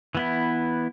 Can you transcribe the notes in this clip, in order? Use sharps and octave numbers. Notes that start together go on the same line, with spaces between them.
E3 B3 E4